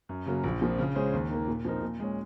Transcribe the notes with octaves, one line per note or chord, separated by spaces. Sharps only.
F#2
C#3 F#3 A#3
A#1
A#2 F3 C4
C#3
G#3 C#4 G#4 C5
D#2
D#3 A#3
A#2
F3 C4 D#4 A#4
A#2
G#3 C#4